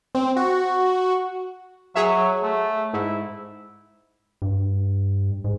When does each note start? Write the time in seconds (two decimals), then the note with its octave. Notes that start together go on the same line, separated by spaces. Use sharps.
0.15 C4
0.37 F#4
1.96 F#3 G#4 C#5 E5
2.43 A3
2.94 G#2 E4
4.42 G2
5.44 G#2